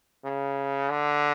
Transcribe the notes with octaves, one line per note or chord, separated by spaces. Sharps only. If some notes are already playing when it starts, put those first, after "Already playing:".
C#3
D3